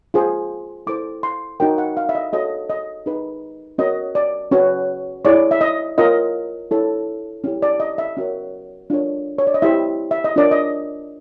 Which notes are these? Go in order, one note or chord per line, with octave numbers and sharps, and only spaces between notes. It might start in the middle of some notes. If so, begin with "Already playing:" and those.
F4 G#4 C5
E4 A4 C5 D6
C6
D#4 F#4 A#4 C#5 G5
F#5
F5
E5
D#5
F#4 A4 C#5 D#5
D#5
D#4 G#4 B4
C#4 F#4 A#4 C#5 D#5
D5
C#4 F#4 B4 C#5
E4 G#4 C#5 D5
E5
D#5
F4 A#4 C#5 D#5
E4 A4 C#5
C#4 E4 G4
D5
D#5
E5
C#4 F#4 A#4 C#5
D4 F4 A#4 C#5
C#5
D5
D#5
E4 G4 C5 E5
E5
D#5
D4 F4 A#4 C#5 D5
D#5